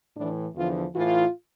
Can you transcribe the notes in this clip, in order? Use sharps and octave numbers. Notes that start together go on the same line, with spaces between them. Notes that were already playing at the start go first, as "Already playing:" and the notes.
A2 E3 D4
E2 D3 F3 F4
A2 E3 F4